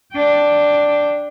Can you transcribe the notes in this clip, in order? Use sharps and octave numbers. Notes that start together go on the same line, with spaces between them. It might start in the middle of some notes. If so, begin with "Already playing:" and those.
D4 G5